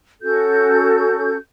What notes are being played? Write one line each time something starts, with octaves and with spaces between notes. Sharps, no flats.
C#4 F#4 A4 G6